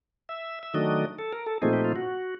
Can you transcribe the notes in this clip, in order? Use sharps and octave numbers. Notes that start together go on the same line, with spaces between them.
E5
E5
D#3 F#3 A3 D4 D#5
A4
A#4
A4
A#2 F3 A3 C4 D#4 G#4
G4
F4
F#4